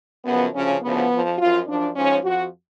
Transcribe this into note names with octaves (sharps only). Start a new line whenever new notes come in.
F#2 C#3 F3 B3
D2 C#3 F3 C#4
D2 C#3 F3 B3
F2 F3
F#2 F3 F4
F#2 F3 D4
G#2 F3 C#4
F2 F3 F#4